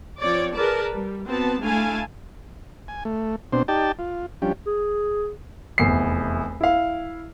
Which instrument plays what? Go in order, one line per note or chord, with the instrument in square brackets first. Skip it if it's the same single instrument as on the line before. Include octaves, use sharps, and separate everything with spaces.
[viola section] F3 C4 C#5 D5
G#4 A#4 B4 D5 A5
G3
B3 C4 F#4 A5
D3 A3 E4 F5 G#5 A5
[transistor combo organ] G#5
A3
B2 C4 D4 C5
D#4 G4 D5 G5 A5
F4
F3 G3 C#4 D4 G4
[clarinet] G#4
[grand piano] F1 E2 C7
E4 F5